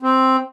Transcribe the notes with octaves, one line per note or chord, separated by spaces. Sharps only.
C4